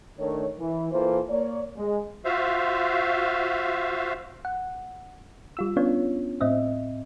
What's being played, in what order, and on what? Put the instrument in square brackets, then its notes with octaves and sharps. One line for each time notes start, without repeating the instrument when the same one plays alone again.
[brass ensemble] D#3 A3 D4 A#4 C#5
E3
E3 A#3 F4 A4 C5
A#3 C#5 D5
G#3
[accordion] F4 F#4 C5 E5 F5
[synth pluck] F#5
G3 F4 E6
B3 C#4 D4 F4 C#5
A2 C4 D#5 E5